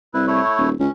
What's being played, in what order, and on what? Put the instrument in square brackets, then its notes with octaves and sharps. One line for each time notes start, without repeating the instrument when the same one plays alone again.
[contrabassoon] C2 [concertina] E4 B4
[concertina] A3 E4 C#5
[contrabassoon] D#1
[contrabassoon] C#2 [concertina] C#4